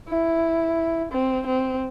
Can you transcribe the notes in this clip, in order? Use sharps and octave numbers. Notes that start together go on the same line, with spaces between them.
E4
C4
C4